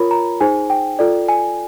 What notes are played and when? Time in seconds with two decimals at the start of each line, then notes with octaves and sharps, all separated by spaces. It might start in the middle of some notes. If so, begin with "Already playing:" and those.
Already playing: F4 A#4 C#5 B5
0.11 A#5
0.41 D#4 G#4 C5 G#5
0.70 G5
0.99 F4 A4 D5
1.29 G#5